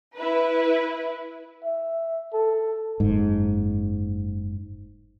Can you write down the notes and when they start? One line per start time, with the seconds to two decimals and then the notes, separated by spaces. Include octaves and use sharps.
0.16 E4 B4
1.64 E5
2.33 A4
3.00 F#1 G#2